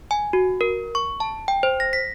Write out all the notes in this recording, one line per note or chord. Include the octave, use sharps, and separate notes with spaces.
G#5
F#4
A#4
C#6
A5
G5
C5
A#6
B6